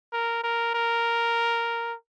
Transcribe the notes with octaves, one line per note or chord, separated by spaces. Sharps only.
A#4
A#4
A#4